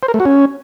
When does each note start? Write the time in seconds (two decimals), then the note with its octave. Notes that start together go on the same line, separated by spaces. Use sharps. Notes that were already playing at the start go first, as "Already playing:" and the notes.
0.03 C5
0.08 A#4
0.14 A3
0.20 F#4
0.25 C#4